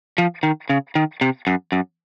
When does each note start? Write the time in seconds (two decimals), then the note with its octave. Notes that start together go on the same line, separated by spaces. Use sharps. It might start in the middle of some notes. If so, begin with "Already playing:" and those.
0.18 F3
0.43 D#3
0.70 C#3
0.95 D#3
1.21 C3
1.47 F#2
1.72 F#2